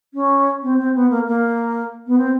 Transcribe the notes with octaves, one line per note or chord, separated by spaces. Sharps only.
C#4
C4
C4
B3
A#3
A#3
B3
C4